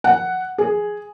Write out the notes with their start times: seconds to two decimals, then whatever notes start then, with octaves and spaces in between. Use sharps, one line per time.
0.04 F#5
0.58 G#4